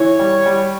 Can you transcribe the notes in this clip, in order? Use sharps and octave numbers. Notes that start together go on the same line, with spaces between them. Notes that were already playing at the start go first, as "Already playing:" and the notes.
Already playing: E3 C#5
G3
G3